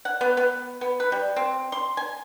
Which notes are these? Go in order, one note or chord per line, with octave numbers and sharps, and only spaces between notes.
F#5
B3
B3
B3
B4
G3
C4
C6
G#5